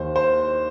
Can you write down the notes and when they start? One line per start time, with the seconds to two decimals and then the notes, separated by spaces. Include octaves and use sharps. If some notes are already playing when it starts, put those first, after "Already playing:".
Already playing: D#2 D#3 C5
0.16 C5